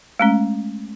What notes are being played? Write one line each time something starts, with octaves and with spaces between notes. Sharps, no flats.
G#3 A3 C#4